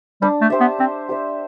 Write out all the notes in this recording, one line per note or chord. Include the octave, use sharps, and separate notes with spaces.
G3 D4
A3
G4 C5 E5
B3
C4 D4
G4 C5 E5